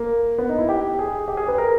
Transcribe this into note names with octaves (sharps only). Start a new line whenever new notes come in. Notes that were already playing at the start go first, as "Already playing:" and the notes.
Already playing: A#3
B3
D#4
E4
G4
G#4
G4
G#4
B4
A#4